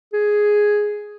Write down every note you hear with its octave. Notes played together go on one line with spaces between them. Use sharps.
G#4